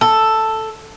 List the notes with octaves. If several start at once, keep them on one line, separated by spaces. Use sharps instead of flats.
A4